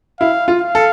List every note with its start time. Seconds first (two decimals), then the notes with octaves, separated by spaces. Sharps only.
0.20 E4 F5
0.48 F4
0.61 F5
0.75 A4